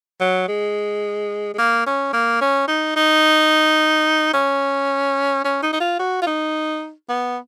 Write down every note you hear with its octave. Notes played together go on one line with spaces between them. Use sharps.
F#3
G#3
G#3
A#3
C#4
A#3
C#4
D#4
D#4
C#4
C#4
D#4
D#4
F4
F#4
F4
D#4
B3